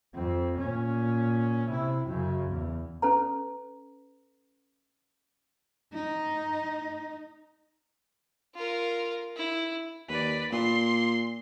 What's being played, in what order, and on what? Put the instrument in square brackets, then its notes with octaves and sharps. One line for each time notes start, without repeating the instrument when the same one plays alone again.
[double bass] F2 C4
A#2 C#4
C3 E4
F#2 C#3
E2
[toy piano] C#4 A4 B4 A#5
[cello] D#4
[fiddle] F4 A#4
E4
[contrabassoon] D#2 [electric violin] B4 D5
[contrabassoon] A#2 [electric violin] C6